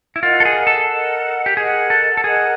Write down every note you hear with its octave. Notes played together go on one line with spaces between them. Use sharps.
E4
F4 A#4 D#5 F#5
A4
G#4
A4
A#4 D#5 F#5
G4
G#4 A#4 D#5 F#5
A4
A4
G#4 A#4 D#5 F#5